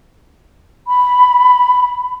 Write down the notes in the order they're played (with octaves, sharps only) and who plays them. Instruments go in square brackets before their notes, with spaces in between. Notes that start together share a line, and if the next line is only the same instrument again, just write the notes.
[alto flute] B5